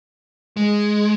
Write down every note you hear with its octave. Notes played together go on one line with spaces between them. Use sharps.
G#3